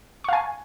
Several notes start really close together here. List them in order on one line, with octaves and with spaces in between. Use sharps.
C#6 F5 G#5